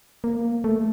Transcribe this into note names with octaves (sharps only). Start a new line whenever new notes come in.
A#3
A3